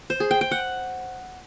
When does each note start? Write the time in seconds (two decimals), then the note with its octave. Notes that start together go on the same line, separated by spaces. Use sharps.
0.10 C5
0.20 G#4
0.31 G5
0.41 G5
0.51 F#5